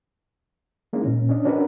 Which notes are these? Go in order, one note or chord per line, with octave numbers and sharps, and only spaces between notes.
G3 G#3 A#3 C#4 D#4 E4
A#2 C#4
C#4 D4 D#5
C#4 D4 F#4 A#4 B4